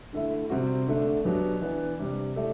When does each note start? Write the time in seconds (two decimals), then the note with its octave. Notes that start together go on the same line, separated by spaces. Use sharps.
0.13 D3 A3 E4
0.50 C3 G3 C4 F#4
0.87 D3 A3 D4
1.25 B2 F#3 B3 D4 G4
1.61 E3 B3 D4
1.99 C3 G3 D4 G4
2.36 A3 E4 G4 D5